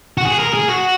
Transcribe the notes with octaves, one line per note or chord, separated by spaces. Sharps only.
F#4
G#4
A#4
G#4
F#4